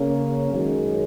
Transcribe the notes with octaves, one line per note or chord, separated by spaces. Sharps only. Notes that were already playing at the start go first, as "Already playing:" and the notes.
Already playing: C#3 A#3 C#4
F#2 D#3 G#3 C#4